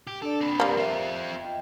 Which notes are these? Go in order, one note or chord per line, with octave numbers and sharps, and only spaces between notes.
G4
D4 A4 D5
C4 B4
G3 A#3 A#4 D5 C6
C4 F4 E5
F4 D#5 G5